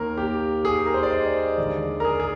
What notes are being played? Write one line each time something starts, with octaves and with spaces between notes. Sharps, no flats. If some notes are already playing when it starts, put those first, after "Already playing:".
Already playing: D#2 D#3 A#3 A#4
G4
G#4
A#4
C5
D5
D#5
D#2 D3 G#3 D5
A#4
G#4
G#4